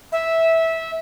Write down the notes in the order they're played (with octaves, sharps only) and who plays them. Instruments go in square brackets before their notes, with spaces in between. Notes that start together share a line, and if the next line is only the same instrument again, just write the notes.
[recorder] E5